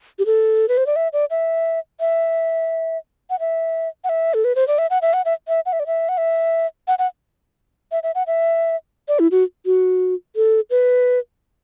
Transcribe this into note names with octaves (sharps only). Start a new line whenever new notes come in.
G4
A4
B4
C5
D5
E5
D5
E5
E5
F#5
E5
F#5
E5
A4
B4
C5
D5
E5
F#5
E5
F#5
E5
E5
F#5
E5
D5
E5
F#5
E5
F#5
F#5
E5
E5
F#5
E5
D5
E4
F#4
F#4
A4
B4